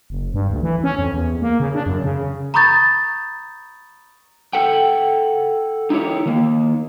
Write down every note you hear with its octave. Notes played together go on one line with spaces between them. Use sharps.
F#1
G2
D2
E3
C#4
F2
E2
A#3
C#3
D4
F#2
C#3
A#5 B5 C#6 D#6 G6 A6
A4 F#5 G5
D#4 E4 G4 C#5
D#3 A#3